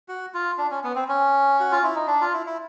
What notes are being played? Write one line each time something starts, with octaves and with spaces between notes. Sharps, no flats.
F#4
F4
D4
C#4
B3
C4
C#4
F#4
F4
E4
D#4
D4
F4
E4
E4